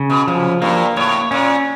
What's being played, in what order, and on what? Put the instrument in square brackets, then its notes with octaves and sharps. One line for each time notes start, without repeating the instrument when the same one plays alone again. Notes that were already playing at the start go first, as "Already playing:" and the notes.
Already playing: [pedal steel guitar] C#3
[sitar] B2
[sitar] F#2 [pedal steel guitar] F3
[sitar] G2 [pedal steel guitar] A#3
[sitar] A2 [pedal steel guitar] C#5
[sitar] A#2 [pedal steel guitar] C#4